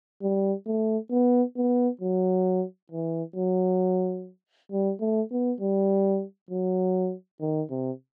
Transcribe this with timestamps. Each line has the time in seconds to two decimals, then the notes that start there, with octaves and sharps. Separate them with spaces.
0.22 G3
0.66 A3
1.11 B3
1.57 B3
2.01 F#3
2.92 E3
3.36 F#3
4.72 G3
5.01 A3
5.32 B3
5.61 G3
6.51 F#3
7.41 D#3
7.70 C3